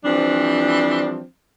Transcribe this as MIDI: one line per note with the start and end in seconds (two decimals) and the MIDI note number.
0.05 1.22 52
0.05 1.22 53
0.05 1.22 55
0.05 1.22 60
0.05 1.22 62